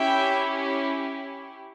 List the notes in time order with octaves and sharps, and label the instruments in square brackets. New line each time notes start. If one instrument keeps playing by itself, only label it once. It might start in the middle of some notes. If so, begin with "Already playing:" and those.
Already playing: [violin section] C#4 E4 G4 E5 G5